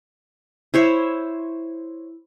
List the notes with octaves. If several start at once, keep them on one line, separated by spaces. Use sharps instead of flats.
E4 C5 C#5 E5